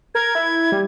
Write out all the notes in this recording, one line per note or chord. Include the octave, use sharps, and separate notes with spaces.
A#4 G#6
E4
G3